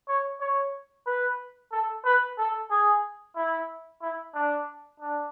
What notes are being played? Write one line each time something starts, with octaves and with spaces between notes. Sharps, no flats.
C#5
C#5
B4
A4
B4
A4
G#4
E4
E4
D4
D4